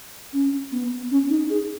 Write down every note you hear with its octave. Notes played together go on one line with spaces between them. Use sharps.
C#4
B3
C#4
D#4
G#4